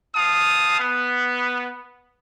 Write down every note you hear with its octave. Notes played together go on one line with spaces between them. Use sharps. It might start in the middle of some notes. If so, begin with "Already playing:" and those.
C4 F5 A5 D#6
B3